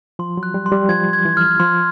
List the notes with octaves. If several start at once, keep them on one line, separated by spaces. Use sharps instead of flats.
F3 C6
F#3
F#6
G3
C6
G3
F3 G#6
G#6
E3
F6
F3 C6